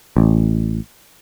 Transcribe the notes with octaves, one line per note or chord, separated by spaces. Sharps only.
A1